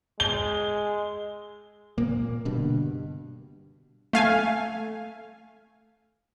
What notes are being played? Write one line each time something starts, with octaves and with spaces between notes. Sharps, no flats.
G#3 G7
A#2 A#3
G2 B2 D3
A3 F5 G#5